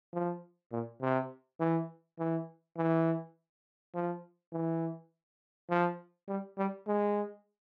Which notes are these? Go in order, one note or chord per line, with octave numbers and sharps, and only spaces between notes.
F3
A#2
C3
E3
E3
E3
F3
E3
F3
G3
G3
G#3